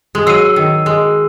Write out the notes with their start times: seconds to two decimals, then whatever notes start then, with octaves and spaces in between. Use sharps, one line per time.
0.15 G#3
0.26 F#3 E6 C7 D#7
0.56 D#3
0.86 G#3